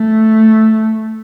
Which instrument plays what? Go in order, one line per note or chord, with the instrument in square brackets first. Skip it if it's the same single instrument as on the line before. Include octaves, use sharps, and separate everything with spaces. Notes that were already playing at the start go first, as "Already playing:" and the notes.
Already playing: [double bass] A3